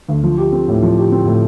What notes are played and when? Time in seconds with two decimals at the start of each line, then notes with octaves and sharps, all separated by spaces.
0.09 D2
0.23 F3
0.37 G4
0.52 C4
0.68 A2
0.82 F3
0.97 G4
1.12 C4
1.26 A2